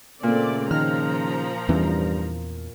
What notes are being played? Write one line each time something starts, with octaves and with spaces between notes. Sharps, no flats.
A#2 C#3 A3 C4 D5
D#3 F3 A#5 F6
E2 G2 E3 C#4